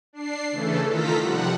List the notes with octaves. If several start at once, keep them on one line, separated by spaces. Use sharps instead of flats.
D4 C7
C#3 E3 A3 A4
D#3 F4 A4 A#5 B6
C3 F3 G3 F#5